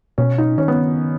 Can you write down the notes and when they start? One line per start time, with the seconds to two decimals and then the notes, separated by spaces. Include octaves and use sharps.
0.18 B2 C#4
0.38 D#4
0.58 D#3 C#4
0.68 B3